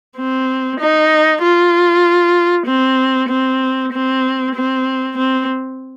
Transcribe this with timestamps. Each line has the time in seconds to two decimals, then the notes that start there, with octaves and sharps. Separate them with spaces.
0.17 C4
0.80 D#4
1.42 F4
2.67 C4
3.29 C4
3.93 C4
4.55 C4
5.17 C4